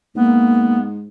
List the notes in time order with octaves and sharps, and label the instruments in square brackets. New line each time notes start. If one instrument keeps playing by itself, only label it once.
[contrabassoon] G#2 [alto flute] A#3 [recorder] B3